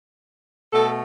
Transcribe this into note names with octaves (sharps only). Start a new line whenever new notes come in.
B2 A3 A4